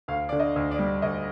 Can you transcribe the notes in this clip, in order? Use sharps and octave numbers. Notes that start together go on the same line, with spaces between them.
D2 F5
D3 D5
D#5
D2
D5
G3
D2 D#5